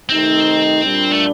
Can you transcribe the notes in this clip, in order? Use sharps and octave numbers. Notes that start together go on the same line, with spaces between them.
C3 D#3 A3 C4 D#4
A#2 G3 D4
A3